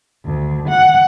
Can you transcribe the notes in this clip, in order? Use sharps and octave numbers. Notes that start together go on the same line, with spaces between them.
D2
F#5